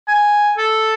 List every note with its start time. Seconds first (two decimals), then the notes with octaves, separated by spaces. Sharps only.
0.08 G#5
0.58 A4